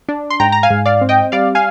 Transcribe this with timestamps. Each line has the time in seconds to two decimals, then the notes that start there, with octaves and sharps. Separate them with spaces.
0.09 D4
0.30 C6
0.40 G#2 G5 A#5
0.52 A#5
0.63 F5 G#5
0.70 G#2
0.86 D5 F5
1.01 C4
1.09 D#5 G5
1.32 G3 D5 F5
1.55 F5 G#5